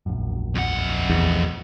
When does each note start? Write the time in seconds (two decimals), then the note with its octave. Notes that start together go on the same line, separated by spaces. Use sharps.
0.06 E1 A#1 F#2
0.55 F2 F#5
1.10 E2